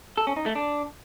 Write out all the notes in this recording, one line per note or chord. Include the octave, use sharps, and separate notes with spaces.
A4
C#4
D#4
A3
D4